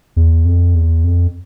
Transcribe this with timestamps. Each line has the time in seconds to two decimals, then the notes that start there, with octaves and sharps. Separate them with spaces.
0.16 E2
0.45 F2
0.75 E2
1.04 F2